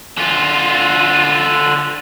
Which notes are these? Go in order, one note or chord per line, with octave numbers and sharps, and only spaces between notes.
D3 F4